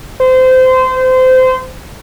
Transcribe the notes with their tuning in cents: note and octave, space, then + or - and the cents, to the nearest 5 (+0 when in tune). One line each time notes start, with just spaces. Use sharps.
C5 -25